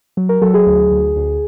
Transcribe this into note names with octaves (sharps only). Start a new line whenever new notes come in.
F#3
A#4
F#3 A4
G#4
D2
D2
D2